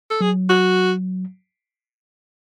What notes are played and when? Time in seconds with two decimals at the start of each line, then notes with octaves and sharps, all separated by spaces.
0.10 A4
0.21 F#3 G#4
0.49 F#4